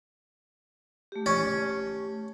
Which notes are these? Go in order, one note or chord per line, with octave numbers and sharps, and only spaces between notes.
A3 G4
C#4